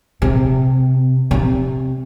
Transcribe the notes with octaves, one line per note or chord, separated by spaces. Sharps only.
C3
C3